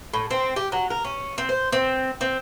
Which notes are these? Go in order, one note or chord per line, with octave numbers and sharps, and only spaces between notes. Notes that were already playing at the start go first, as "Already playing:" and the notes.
A2
C4
G4
F#3
A#4
C#4
C4
C5
C4
C4